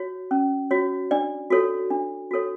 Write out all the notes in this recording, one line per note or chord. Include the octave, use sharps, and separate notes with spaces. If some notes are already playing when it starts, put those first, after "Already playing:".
Already playing: F#4 C#5
C#4
F#4 C#5
D4 D5
F#4 A4 C#5
D4
F#4 A4 C#5